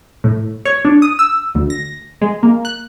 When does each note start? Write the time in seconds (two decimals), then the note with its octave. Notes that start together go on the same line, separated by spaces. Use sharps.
0.24 A2
0.65 C#5
0.85 D4
1.02 D#6
1.19 E6
1.55 D2
1.70 A#6
2.21 G#3
2.43 A#3
2.65 F#6